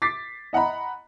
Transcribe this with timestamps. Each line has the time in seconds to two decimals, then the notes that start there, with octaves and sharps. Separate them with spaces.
0.02 D6 A6 B6 C7
0.53 D#5 F#5 A#5 B5